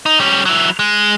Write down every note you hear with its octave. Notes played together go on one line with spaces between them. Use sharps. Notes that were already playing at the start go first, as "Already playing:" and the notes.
D#4
G3 C#4
F#3 E4
G#3